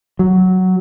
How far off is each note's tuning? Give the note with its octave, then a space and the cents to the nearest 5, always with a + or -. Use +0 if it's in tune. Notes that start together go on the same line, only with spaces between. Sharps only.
F#3 +5